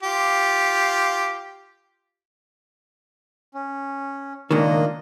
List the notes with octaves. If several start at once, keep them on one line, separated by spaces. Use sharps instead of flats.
F4 G4
C#4
C#2 A#2 D#3 A#3 D4 D#5